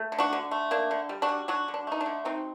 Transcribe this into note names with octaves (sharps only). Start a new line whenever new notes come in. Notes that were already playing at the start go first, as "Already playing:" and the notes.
Already playing: A3
D3
D4 F#4
D3
A3
A#3 D4
D3
G3
D4 F#4
G3
F#3 D4 F#4
D3
D4
A3 D#4
D4
D3
F#3 C4 D#4